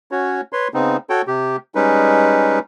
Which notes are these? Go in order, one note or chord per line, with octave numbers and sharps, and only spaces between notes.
C#4 F#4 C#5
B4 C#5 C6
C#3 B3 C4 D#4
F#4 A4 C#5 G5
C3 G4
G3 G#3 C#4 D#4 B4